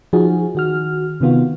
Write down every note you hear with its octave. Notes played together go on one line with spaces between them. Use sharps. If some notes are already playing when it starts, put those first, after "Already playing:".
F3 D#4 F#4 G#4
D#3 F#4 F6
C3 D#3 B3 F4 F#4